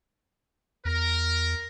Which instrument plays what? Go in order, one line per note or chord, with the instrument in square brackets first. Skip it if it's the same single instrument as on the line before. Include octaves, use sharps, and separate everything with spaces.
[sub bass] E2 [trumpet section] A#4